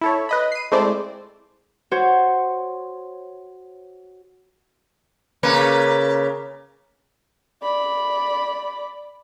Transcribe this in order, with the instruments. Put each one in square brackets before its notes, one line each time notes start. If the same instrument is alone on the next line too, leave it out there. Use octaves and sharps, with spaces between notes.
[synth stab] E4 A4 C#5
B4 D#5 B5
C7 D#7
G#3 A3 C4 E4 C5 D5
[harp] F#4 C5 C#5
[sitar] C#3 A#3 B4
[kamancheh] D5 B5